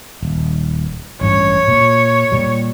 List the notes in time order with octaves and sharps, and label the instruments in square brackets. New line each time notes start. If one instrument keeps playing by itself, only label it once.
[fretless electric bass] D#1
[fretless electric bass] A1 G2 C#4 [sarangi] C#5
[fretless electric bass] A#2
A#2 G3